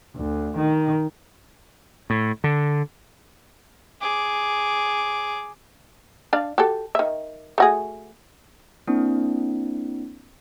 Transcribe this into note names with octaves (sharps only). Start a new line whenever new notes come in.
D2
D#3
A2
D3
G#4 D6
D4 D5 F5
F#4 G4 A4
D#3 E5
A3 F#4 G#4
A#3 C4 D4 E4